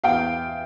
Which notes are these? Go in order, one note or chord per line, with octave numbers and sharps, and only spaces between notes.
E2 F5 G5